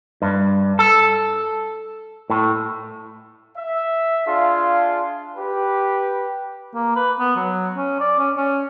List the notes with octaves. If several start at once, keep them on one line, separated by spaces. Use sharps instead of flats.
G2
A4
A2
E5
D4 F4 G#4 F5 C6
G4 B4
A#3
B4
B3
F#3
C#4
D5
C#4
C#4